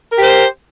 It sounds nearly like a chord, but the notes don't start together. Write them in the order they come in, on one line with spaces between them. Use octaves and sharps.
A#4 G4 C5